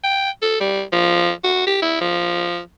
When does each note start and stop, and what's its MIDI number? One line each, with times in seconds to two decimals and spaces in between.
0.04 0.30 79
0.42 0.56 69
0.60 0.82 55
0.92 1.31 53
1.44 1.64 66
1.67 1.80 67
1.82 2.00 64
2.00 2.59 53